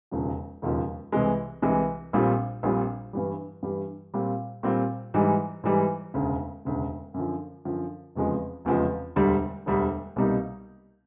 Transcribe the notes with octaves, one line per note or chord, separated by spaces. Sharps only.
E1 D#2 C#3 F3
E1 D#2 C#3 F3
C2 C3 E3 G#3
C2 C3 E3 G#3
A#1 A#2 G3 C4 F4
A#1 A#2 G3 C4 F4
G2 E3 G3
G2 E3 G3
A#2 G3 C4 F4
A#2 G3 C4 F4
G#2 E3 G3
G#2 E3 G3
E1 D2 C#3
E1 D2 C#3
F#2 D3 F3
F#2 D3 F3
F1 E2 C#3 F3 G#3
F1 E2 C#3 F3 G#3
E1 D2 D3 G3
E1 D2 D3 G3
C2 B2 G3 A#3 D#4